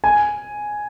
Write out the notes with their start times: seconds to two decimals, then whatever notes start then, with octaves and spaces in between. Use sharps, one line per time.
0.04 G#5